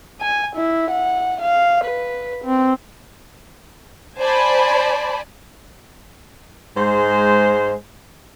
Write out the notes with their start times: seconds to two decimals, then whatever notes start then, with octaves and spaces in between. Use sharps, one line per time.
0.21 G#5
0.56 E4
0.91 F#5
1.41 F5
1.84 B4
2.45 C4
4.18 C5 D5 G#5 A5 B5
6.77 G#2 G#3 C5